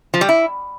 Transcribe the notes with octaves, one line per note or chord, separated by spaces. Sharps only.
F3
G3
E4